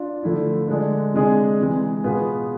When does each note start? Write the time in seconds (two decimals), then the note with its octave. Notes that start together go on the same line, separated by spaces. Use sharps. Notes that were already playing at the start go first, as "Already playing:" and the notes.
Already playing: D4 F4
0.23 D3 F3 A3 E4
0.68 D3 G#3 D4
1.14 C3 G#3 D4 G#4
1.59 C3 E3 G#3
2.04 B2 B3 F4 G#4 B4